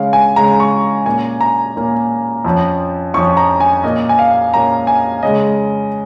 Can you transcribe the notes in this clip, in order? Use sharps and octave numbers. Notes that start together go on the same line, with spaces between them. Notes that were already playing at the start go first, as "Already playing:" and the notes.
Already playing: C#3 G#3 C#4 F5
G#5
C#3 G#3 C#4 A#5
C#6
A#2 A#3 C#4 G#5
A#5
A#2 A#3 C#4
F2 F3 C#4
F2 F3 C#4 C#6
A#5
G#5
A#2 A#3 C#4 D#5
G#5
F5
A#2 A#3 C#4 A#5
G#5
C#3 G#3 C#4 D#5